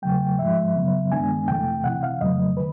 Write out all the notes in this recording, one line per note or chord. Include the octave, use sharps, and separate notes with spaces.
E2 C#3 F#3 A3 G5
G#2 F3 G#3 E5
F#2 C#3 F#3 B3
G2 D#3 G#3 B3 D4 G#5
F2 C3 E3 A3 G5
C2 C3 E3 F#5
F5
F2 C#3 F#3 A3 D#5
D#3 B4